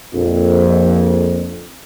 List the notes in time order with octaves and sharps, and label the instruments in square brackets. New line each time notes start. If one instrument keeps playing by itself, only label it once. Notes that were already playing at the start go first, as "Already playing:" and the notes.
[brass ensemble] A#1 F2